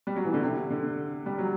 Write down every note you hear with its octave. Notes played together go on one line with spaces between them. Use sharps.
G3
F#3
E3
D3
C3
D3
G3
F#3